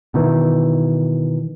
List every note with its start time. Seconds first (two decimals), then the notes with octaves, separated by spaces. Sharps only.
0.14 B2 D#3 E3